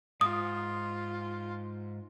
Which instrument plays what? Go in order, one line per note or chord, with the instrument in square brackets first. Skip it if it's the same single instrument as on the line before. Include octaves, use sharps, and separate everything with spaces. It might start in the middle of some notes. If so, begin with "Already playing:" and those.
[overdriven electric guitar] G#2 [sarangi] F4 [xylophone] D#6